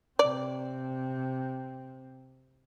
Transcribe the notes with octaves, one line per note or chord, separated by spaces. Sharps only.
C3 C4 D5